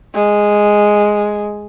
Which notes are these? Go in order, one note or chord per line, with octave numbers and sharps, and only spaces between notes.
G#3